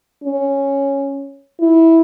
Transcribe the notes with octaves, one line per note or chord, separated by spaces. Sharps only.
C#4
E4